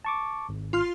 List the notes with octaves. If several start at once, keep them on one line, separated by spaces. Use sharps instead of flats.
A5 C#6 D6
G#1
F4 C6 F6